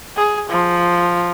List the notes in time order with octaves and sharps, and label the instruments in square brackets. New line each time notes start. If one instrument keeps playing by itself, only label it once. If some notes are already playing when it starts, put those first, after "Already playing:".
[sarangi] G#4
F3